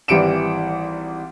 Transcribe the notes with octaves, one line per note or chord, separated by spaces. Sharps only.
G#1 E3 G3 C#7 D7 E7